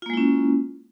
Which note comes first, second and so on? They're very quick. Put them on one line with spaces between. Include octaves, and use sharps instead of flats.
F4 A#3 G#3 E4 C#4